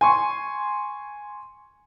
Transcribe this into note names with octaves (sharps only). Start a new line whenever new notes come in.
G#5 C6 C#6